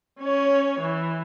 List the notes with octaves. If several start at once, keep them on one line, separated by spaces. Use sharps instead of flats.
C#4 C#5
E3